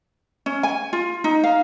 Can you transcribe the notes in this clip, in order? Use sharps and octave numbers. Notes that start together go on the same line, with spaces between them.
C#4
G#5
F4
D#4
F5